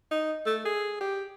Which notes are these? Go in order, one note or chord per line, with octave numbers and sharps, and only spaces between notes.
D#4
A3
G#4
G4